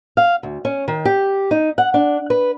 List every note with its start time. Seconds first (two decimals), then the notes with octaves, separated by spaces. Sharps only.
0.17 F5
0.43 D2
0.65 C#4
0.88 D#3
1.05 G4
1.51 D#4
1.78 F#5
1.94 D4
2.30 B4